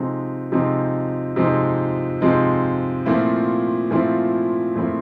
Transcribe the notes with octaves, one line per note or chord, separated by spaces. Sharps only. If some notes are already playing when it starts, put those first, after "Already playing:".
Already playing: C3 F3 G#3 C4 D#4
C3 F3 G#3 C4 D#4
C3 F3 G#3 C4 D#4
C3 F3 G#3 C4 D#4
A#2 F3 A3 C4 E4
A#2 F3 A3 C4 E4
A#2 F3 A3 C4 E4